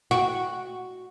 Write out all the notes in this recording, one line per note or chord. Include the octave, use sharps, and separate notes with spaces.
F#4